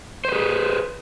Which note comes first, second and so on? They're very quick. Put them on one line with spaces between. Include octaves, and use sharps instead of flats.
C5 B4 G#4